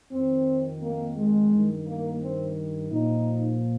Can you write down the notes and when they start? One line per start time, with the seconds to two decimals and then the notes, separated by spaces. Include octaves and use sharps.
0.12 F2 D#3 C4
0.82 A#3
1.17 G#3
1.51 G2 D#3
1.86 A#3
2.22 C4
2.91 A#2 F3 D#4